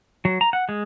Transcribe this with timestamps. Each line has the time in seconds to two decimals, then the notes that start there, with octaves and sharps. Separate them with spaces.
0.25 F#3
0.41 A#5
0.53 F#5
0.69 G#3